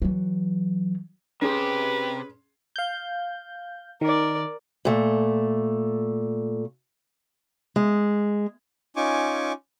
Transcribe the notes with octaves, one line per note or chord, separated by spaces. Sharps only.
E3 F#3
C3 C#4 G4 G#4 B4 C6
F5 G6
D#3 A#4 D5
A#2 A3
G#3
C#4 D#4 F4 G#5 C#6 D6